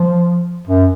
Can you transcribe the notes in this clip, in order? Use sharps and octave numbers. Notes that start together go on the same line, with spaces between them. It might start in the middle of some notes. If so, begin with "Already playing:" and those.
Already playing: F3
F#2